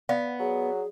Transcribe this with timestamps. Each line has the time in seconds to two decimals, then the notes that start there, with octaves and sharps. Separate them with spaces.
0.09 B3 D5 F5 B5
0.40 F#3 G#4